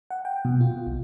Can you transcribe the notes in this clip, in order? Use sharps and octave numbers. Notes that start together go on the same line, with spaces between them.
F#5
G5
B2
F4
B1